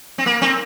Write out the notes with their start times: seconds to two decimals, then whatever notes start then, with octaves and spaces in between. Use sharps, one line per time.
0.18 C4
0.26 A#3
0.42 C4